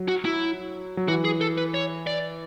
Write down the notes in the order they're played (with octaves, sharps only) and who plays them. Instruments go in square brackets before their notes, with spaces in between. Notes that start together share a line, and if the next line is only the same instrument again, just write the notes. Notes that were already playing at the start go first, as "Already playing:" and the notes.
Already playing: [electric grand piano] F#3
[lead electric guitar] F#4
E4
[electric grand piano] F#3
[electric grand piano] E3 [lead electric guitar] F#4
[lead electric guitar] G#4
A4
B4
C#5
D5